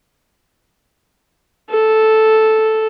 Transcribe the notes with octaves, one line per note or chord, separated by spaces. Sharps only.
A4